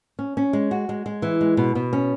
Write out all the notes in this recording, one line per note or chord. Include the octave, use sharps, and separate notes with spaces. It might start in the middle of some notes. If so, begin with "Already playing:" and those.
C#4
C#4
G#3
F#4
G#3
G#3
E3
G#3
B2
B2
C#4